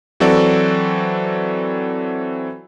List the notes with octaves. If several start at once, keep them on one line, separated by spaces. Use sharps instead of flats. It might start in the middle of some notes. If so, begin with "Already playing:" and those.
E3 F#3 C4 F#4 A4 D5